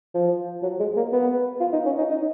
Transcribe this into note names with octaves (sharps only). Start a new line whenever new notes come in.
F3
F#3
G#3
A#3
B3
F4
D#4
C#4
D#4
D#4